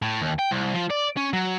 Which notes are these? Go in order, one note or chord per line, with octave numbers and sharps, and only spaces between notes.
A2
D#2
G5
C2
F3
D5
C#4
F#3